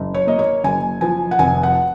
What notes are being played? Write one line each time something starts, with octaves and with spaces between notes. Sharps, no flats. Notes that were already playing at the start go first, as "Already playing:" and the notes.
Already playing: F#1
C#5
A#3 D#5
C#5
F#1 G#5
F3 G#5
F#5
F1 G#5
F#5